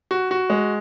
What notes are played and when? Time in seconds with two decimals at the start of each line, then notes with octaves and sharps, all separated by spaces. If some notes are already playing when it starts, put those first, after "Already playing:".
0.11 F#4
0.31 F#4
0.50 G#3